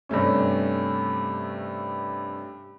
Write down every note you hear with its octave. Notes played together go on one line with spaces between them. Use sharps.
G2 C3 A3 C#4